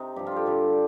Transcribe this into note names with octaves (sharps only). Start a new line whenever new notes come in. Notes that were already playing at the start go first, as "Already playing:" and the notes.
Already playing: C3 D#4
G2 F3 G4
F4
G4 A4
G2 D3 G3